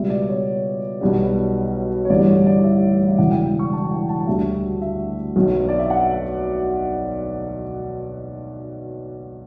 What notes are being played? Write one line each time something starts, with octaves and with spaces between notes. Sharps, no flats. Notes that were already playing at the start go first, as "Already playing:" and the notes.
Already playing: C#2 B2 G3 E5
D5
C#5
B1 B2 G3
C#5
A1 G2 D3 G3 D5
C#5
D5
E5
E5
E1 E2 C#3 E3 F#5
G5
C#6
A5
G5
A5
D2 D3 G3 E5
E5
B1 B2 F#3
D5
E5
F#5